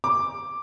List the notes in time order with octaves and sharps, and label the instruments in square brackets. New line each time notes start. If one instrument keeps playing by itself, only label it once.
[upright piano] D6